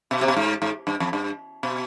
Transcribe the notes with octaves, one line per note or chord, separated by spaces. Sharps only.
B2
C3
B2
G#2
G#2
G2
F2
G2
B2